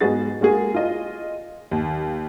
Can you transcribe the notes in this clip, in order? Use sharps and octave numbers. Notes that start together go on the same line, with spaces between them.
G#2 B3 F#4 G#4 F#5 A6
G#3 A#3 F#4 G#4
F4 D#5
D#2